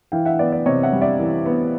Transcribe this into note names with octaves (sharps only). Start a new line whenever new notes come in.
E3 F5 G5
E5 F#5
B3 D5
D5
C3 C#5 D#5
E5 F#5
G3
D5 E5
E3
B3